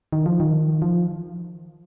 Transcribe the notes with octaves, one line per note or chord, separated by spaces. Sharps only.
D#3
F3
D#3
F3